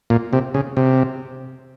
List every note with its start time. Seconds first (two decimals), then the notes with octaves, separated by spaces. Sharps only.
0.10 A#2
0.33 C3
0.54 C#3
0.77 C3